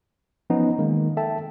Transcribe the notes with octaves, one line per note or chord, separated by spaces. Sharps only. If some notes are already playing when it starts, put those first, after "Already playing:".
E3 F3 B3 C#4 D#4
D#3 G#3 A#3
A4 E5 G5 A5